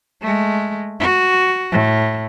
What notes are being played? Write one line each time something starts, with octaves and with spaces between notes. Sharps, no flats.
G#3 A3
F#4
A2